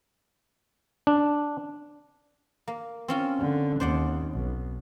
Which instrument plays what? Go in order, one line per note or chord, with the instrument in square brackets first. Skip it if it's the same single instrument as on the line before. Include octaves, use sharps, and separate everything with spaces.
[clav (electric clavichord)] D4
[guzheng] A#3
C4 C#4 F4
[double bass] D3
[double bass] D#2 [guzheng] C5 D5 F#5
[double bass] B1